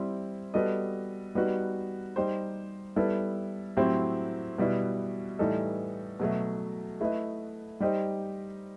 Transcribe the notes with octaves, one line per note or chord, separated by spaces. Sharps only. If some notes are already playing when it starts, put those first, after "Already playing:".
Already playing: G3 C4 E4
G3 B3 F#4 A4 D#5
G3 B3 D#4 F#4
G3 D#4 G4 C5
G3 B3 E4 A4
A2 F#3 C4 E4 G4
B2 G3 B3 E4
A2 E3 G3 D#4 A4
B2 F#3 A3
A3 E4 B4 D#5
G3 D#4 G4 C5 D#5